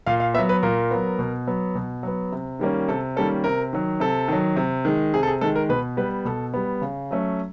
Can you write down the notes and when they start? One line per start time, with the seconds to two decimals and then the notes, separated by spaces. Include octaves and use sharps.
0.07 A#2 F5
0.20 F5
0.34 B3 E5
0.39 F#3
0.49 B4
0.63 A#2 A#4
0.91 F#3 B3
1.19 B2
1.47 F#3 B3
1.75 B2
2.03 F#3 B3
2.32 C3
2.59 D#3 G3 A#3 C#4
2.88 C3 A4
3.17 D#3 G3 A#3 C#4 A4
3.44 C3 A#4
3.73 D#3 F#3
4.00 C3 A4
4.28 D#3 F#3
4.56 C3
4.85 D#3 G#3
5.14 C3 G#4
5.23 A4
5.28 G#4
5.41 D#3 G#3 A4
5.56 A#4
5.69 B2 B4
5.97 G3 B3 B4
6.25 B2 A4
6.54 G3 B3
6.82 C#3
7.11 F#3 A3 C#4